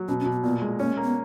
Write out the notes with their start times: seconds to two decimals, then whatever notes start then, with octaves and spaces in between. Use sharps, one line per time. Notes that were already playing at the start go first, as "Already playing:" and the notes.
Already playing: F#3
0.08 B2 C#4
0.20 C#4
0.26 B2
0.32 B3
0.43 A#2 B3
0.62 G#3
0.80 A#3 C#4
0.97 A#3
1.04 B3